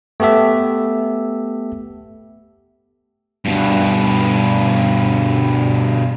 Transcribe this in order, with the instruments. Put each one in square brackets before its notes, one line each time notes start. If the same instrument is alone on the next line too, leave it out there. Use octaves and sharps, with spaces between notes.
[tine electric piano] A3 B3 G4 A4 E5
[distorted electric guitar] G2 B2